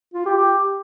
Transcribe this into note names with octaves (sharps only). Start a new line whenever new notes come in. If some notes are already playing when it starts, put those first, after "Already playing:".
F4
G4
G4